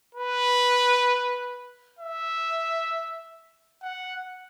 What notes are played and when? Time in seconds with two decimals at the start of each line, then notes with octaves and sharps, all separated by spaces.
0.15 B4
1.99 E5
3.83 F#5